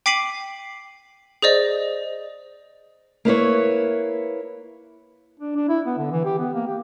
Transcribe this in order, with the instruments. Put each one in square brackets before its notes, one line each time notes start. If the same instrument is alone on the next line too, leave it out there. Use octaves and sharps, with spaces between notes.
[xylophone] G5 D6 B6 C7 D#7 F#7
G#4 C5 D5 D#5
[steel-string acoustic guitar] A#3 E4 B4 C#5
[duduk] D4
D4
E4
B3
D3
E3
G4
B3
A#3
G4